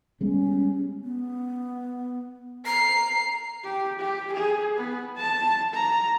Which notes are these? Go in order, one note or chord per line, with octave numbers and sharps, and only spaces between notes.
G3 G#3 B3 C#4
B3
A#5 C7
G4
G4
G#4
B3
A5
A#5